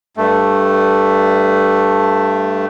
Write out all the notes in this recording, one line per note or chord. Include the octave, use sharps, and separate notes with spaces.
G2 A3